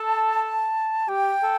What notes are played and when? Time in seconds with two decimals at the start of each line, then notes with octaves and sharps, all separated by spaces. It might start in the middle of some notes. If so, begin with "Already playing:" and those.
Already playing: A4 A5
1.09 G4 G5
1.43 A4